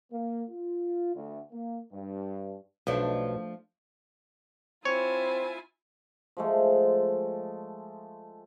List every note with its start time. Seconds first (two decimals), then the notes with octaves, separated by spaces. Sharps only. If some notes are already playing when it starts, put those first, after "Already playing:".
0.12 A#3
0.50 F4
1.16 D2
1.52 A#3
1.93 G2
2.87 B1 F3 A3 D4
4.85 C4 E4 F4 C#5 G#5
6.37 F3 G#3 A3